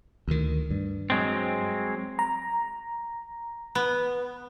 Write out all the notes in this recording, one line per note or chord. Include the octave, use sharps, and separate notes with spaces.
D2 D#3
G2
F#3 G#3 C4
A#5
B3